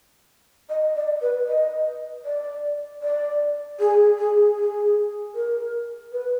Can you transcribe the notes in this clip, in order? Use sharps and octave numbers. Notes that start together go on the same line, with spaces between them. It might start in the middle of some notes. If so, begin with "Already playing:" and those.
D#5
D5
B4
D#5
D5
D5
G#4
G#4
G#4
A#4
B4